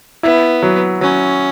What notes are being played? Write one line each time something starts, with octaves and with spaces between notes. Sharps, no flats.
B3 E4
F#3
F#3 C#4